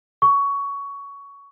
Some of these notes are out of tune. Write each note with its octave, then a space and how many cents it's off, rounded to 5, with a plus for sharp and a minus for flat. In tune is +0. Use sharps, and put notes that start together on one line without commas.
C#6 +15